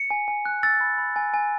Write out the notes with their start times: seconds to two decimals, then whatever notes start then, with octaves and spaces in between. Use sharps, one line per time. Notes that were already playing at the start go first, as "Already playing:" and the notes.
Already playing: C#7
0.11 G#5
0.28 G#5
0.45 F#6
0.63 E6 A6
0.81 B5
0.98 B5
1.16 G#5
1.34 G#5